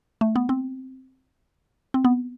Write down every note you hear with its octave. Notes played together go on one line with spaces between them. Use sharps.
A3
B3
C4
C4
B3